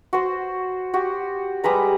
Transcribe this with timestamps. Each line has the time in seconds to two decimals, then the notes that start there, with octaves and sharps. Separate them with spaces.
0.13 F#4 C5
0.94 F#4 G4
1.64 G3 G#3 B4 A#5